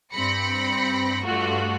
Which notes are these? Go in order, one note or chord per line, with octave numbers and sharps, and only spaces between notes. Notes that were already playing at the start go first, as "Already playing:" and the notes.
G2 C4 B5 A#6 C#7
G2 A3 F4 F#4